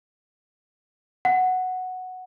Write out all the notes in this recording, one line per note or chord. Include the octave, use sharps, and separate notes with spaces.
F#5